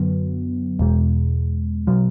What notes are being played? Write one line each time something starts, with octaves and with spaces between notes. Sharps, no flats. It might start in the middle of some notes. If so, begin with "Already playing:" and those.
Already playing: F#2 D3 F#3 B3
E2 B2 G#3
B2 F#3